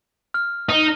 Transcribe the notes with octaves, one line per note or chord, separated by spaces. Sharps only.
F6
D#4